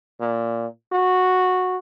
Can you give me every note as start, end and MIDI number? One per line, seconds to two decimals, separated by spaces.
0.20 0.66 46
0.92 1.77 66